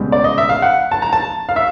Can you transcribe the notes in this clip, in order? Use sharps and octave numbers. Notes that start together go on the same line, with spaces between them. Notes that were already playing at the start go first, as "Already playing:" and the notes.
Already playing: C#2 B2 G3
D5
D#5
E5
F5
F#5
A5
A#5
A5
F5
E5